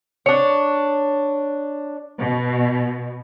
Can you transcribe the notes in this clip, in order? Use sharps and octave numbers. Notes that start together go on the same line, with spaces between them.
D4 C#5
B2